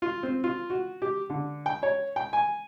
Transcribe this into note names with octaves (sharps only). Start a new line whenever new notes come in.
F4
C4
F4
F#4
G4
D3
G5
C#5
G5
G#5